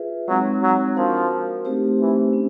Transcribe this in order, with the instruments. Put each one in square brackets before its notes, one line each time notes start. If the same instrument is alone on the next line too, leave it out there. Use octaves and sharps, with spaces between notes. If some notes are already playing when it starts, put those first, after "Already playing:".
Already playing: [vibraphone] F4 G#4 B4 E5
[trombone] F#3 [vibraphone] G#3 C4 D#4
[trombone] F#3
[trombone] F3 [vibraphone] D4 F#4 A#4
[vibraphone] A3 C4 D#4 G4 C5
[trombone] E3
[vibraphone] C#4